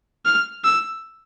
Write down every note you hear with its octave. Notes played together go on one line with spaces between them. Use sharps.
F6
E6